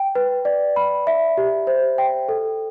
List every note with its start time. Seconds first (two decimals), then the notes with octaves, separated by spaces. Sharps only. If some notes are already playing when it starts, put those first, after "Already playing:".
Already playing: G5
0.15 B4
0.45 D5
0.76 B5
1.07 E5
1.37 G4
1.67 C5
1.98 G5
2.29 A4